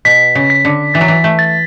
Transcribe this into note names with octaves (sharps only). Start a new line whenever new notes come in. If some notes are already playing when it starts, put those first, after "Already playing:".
B2 B6
C#3
B6
D3
E3 A6
F#3
E3
A3
A6